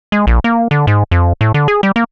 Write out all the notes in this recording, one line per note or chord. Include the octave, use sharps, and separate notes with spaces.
G#3
A#1
A#3
D3
G#2
F2
A2
D3
G#4
G3
A#3